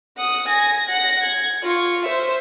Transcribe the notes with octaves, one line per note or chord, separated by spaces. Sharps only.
F#5 D#6
G#5 A#6
F#5 A#6
G#6
F4 C#6
C5 E5